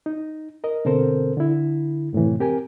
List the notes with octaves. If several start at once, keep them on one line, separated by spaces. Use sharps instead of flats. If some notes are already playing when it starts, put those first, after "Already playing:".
D#4
A#4 D#5
B2 D3 C4 A4 A#4 C5
D3 E4
F#2 A2 C3 E3
C4 G4 A#4 G#5